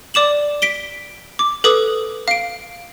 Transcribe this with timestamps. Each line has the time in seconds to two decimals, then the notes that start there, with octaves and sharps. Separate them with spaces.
0.14 D5 D6 E7 F#7
0.62 B6 D7 G7
1.39 D6
1.64 A4 B4 D6 D#6
2.28 F5 D7